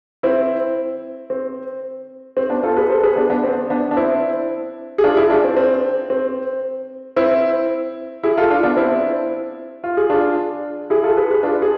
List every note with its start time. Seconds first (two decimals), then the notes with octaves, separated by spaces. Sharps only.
0.23 C4 E4
1.30 C4
2.37 C4
2.50 B3 D4
2.63 F4 A4
2.76 G#4 B4
2.90 A4 C5
3.03 G#4 B4
3.16 B3 D4
3.30 B3 D4
3.44 C4
3.70 B3 D4
3.91 D4
3.97 C4 E4
4.98 G#4
5.03 D4 F4
5.16 E4 G#4
5.30 D4 F4
5.44 C4
5.57 C4
6.10 C4
7.16 C4 E4
8.23 E4 G#4
8.37 F4 A4
8.50 D4 F4
8.63 B3 D4
8.76 C4 E4
9.84 F4
9.97 G#4
10.10 D4 F4
10.90 E4 G#4
11.03 F4 A4
11.17 G#4 B4
11.31 G#4 B4
11.43 D4 F4
11.62 G#4